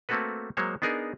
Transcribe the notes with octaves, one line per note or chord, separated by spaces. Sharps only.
A3 A#3 C4 F#4 A4 B4
F#3 G#3 A#3 C5 C#5
B3 D4 D#4 G#4 A#4